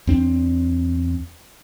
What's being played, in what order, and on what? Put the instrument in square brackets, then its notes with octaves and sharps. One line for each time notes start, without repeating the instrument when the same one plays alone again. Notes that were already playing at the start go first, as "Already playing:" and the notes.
[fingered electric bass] E2 C4 D4